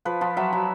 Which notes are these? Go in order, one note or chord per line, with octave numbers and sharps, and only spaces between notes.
F3 B4
F3
F#3 E5
F#3